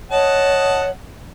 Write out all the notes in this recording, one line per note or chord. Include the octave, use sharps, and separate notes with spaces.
C#5 D#5 F#5 A5